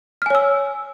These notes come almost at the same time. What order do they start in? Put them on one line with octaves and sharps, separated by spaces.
F6 G#5 C#5 E6